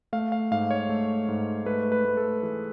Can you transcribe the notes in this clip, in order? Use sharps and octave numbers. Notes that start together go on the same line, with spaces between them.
A3 F5
F5
G#2 F5
C#5
A3
G#2
A3 B4
B4
A3
A4
E3 G#4